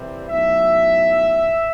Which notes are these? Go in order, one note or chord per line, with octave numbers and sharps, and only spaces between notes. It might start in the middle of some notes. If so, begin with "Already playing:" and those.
Already playing: C2 C3 E3 G3 C4
B1 A2 F#3 E5